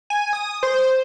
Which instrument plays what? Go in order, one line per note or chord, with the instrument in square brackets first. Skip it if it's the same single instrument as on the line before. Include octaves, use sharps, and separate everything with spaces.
[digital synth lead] G#5
D#6
C5